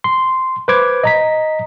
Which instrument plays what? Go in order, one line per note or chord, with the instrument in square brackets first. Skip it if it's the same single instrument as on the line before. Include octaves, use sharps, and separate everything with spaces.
[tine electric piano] C6
B4 C5 D6 G#6
D#5 A#5 B6